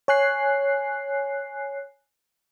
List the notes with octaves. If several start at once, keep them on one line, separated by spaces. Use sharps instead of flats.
C#5 G#5 F#6 C7